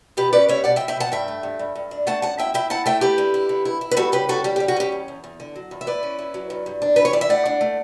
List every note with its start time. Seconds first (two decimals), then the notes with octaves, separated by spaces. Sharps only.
0.17 B2 G4 B4
0.33 C#4 B4 D5
0.49 G3 C#5 E5
0.64 B2 D5 F#5
0.76 E5 G5
0.80 B2
0.88 E5 G5
0.96 B2 F#5 A5
1.12 G2 E5 G5
1.28 A3
1.43 G2
1.59 G2
1.75 G2
1.91 D4
2.07 A3 F#5 A5
2.22 F#2 F#5 A5
2.38 E4 E5 G5
2.54 E4 E5 G5
2.70 E4 F#5 A5
2.86 A3 E5 G5
3.01 E4 G4 B4
3.18 D3
3.34 E4
3.49 D3
3.65 E4
3.81 E4
3.91 B4
3.96 G3 F#4 A4
4.12 C#3 G4 B4
4.29 C#3 F#4 A4
4.44 G3 G4
4.56 G4
4.60 G3
4.68 F#4
4.76 C#4 G4
4.92 E2
5.08 E2
5.24 E2
5.40 D3
5.56 F#3
5.71 E2
5.81 E5
5.87 E4 B4 D5
6.03 C#4
6.19 E4
6.34 F#3
6.50 G2
6.66 G2
6.82 D4
6.96 E3 B4
7.05 C#5
7.13 E3 D5
7.21 E5
7.29 A3 D5 F#5
7.46 D4
7.61 A3